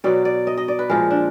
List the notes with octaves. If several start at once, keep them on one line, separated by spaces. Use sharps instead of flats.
B2 F#3 D5
D5
D#5
D#5
D5
B4
A#2 F3 G#3 A#4
D4